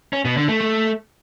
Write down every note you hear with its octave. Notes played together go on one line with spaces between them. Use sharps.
C#4
B2
D3
A3
A3